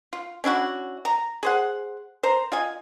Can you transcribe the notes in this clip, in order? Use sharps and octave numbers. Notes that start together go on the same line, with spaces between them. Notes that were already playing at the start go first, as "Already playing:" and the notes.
F4
C#4 D4 E4 F#4
A#5
G#4 C5 F#5
C5 A#5
F4 D#5 G#5